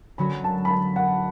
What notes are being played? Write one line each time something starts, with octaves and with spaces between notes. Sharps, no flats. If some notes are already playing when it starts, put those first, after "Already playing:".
D3 F#3 C#4 F#4 B5
A5
B5
A5
F#5